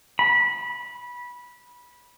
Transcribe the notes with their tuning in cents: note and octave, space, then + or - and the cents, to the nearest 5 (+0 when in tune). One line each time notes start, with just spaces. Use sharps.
B5 -20